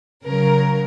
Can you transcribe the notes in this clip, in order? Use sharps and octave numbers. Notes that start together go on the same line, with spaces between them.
C#3 F#3 A#4